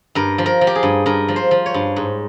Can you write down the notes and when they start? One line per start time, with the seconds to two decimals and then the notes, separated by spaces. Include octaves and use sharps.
0.15 G2 A#4
0.38 F3
0.46 A#4
0.61 F3
0.67 G4
0.75 G#4
0.83 G2
1.06 G2 A#4
1.28 F3
1.36 C5
1.51 F3
1.66 C#5
1.74 G2
1.96 G#2